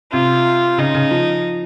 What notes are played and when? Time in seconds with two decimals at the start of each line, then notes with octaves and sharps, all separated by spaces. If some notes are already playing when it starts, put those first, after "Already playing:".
0.12 C3 F4
0.78 C#3 D#4
0.94 C#3
1.11 F3